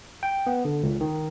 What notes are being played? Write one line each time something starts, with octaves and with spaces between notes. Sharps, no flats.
G5
B3
D3
C#2
D#3